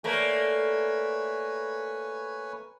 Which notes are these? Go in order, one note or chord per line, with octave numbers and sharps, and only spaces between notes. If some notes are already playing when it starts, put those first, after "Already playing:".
A3 A#3 D4 B4 C#5 G#5